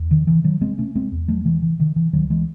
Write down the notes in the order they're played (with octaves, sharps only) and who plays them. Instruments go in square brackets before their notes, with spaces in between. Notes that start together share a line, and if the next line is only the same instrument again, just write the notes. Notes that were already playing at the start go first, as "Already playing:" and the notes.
Already playing: [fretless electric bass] E2
C3 D#3
E3
C3 D#3 F#3
G#3 C4
C3 A3 C#4
G#3 C4
E2
F#3 A3
C3 E3 G#3
E3
C3 D#3
E3
C#2 D#3 F#3
E3 G#3